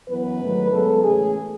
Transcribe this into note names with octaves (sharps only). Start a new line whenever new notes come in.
F#2 E3 B3 B4
G#2 D#3 F#3 A3
F#2 C#3 G#3 B3 A4
A2 E3 A3 C#4 G#4